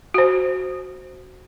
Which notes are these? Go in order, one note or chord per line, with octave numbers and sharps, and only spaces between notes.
F#4 C5